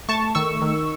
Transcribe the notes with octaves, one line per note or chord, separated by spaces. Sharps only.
A3 A5 C#6
D#3 C#6 E6
D#3